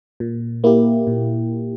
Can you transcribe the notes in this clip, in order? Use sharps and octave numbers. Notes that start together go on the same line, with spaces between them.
A#2
A#3 E4 G4
A#2